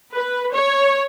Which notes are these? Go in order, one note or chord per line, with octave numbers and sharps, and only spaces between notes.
B4
C#5